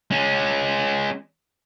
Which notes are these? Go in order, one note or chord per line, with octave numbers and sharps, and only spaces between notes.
G#3 C#4